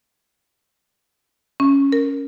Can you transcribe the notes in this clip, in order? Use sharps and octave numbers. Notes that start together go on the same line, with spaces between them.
C#4
A#4